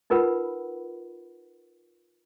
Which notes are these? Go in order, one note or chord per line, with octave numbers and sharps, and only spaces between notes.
D#4 F4 A#4 B4 F#5 B5